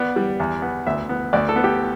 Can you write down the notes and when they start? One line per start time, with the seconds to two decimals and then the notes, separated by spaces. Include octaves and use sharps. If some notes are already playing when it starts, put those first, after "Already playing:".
Already playing: B3 D5
0.16 G3
0.40 E2
0.62 B3
0.87 D2 E5
1.09 B3
1.33 D2 D5
1.49 A4
1.56 B3
1.64 G4